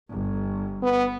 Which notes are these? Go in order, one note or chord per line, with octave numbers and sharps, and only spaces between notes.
G1
B3